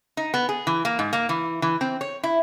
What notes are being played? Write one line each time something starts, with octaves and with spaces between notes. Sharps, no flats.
D#4
B3
G#4
E3
A#3
G#2
A#3
E3
E3
C4
C#5
E4